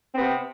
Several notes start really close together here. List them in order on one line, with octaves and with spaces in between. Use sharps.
C4 B3 C3